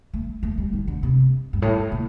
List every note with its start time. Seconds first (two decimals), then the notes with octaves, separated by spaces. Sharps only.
0.14 A3
0.43 A3
0.58 G3
0.73 D#3
0.88 D3
1.03 C3
1.53 G2
1.62 A2
1.92 A#2